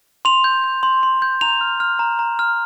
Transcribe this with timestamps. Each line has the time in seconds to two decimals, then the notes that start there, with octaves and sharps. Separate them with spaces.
0.25 C6 F7
0.44 G6
0.64 G6
0.83 C6
1.03 C6
1.22 G6
1.41 A#5 F7
1.61 F6
1.80 F6
1.99 A#5
2.19 A#5
2.39 F6